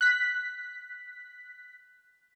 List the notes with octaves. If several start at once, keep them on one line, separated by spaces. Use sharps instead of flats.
F#6 B6